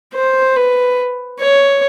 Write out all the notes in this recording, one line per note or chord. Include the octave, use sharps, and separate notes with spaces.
C5
B4
C#5